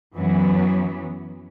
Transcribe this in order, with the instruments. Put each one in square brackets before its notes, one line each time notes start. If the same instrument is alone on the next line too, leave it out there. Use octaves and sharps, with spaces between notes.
[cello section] F#2 E3 F#3 B3